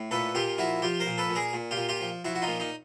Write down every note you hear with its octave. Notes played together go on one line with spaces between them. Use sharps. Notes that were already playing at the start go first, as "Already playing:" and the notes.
Already playing: A2
A#2 A4 B4
A#2 F4 G4
F3 E4 F#4
F3 F4 G4
A#4 C5
A#2
A4 B4
A#2
G#4 A#4
A#2
F4 G4
A#2
F4 G4
F3
F3 E4 F#4
F#4
D#4 F4
A#2
D#4